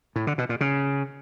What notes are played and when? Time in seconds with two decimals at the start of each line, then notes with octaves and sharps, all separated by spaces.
0.16 A2
0.27 D3
0.38 B2
0.49 A#2
0.61 C#3